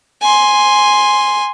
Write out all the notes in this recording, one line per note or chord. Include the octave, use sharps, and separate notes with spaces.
G#5 C6